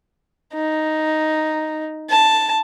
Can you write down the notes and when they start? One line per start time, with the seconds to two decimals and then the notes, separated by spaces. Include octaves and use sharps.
0.54 D#4
2.10 A5